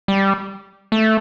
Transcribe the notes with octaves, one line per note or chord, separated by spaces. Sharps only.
G3
A3